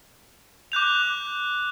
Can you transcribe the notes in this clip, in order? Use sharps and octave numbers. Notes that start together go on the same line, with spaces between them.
D6 F#6 G6 F7